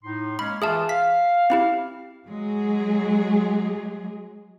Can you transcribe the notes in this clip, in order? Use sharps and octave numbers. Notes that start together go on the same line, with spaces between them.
A2 D#4 C6
G#3 A#3 C#4 B5
E3 F4 G#4 E5 A5
F5 B6
C4 E4 G4
F#3 G#3 G#4